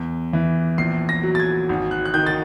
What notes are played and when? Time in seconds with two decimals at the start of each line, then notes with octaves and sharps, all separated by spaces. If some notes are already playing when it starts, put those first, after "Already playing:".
Already playing: E2
0.33 E3
0.78 A#1 C7
1.09 A#6
1.23 F#3
1.35 A6
1.40 G#6
1.69 G#1
1.91 F#6
2.05 F#6
2.14 D#3 G6
2.27 A6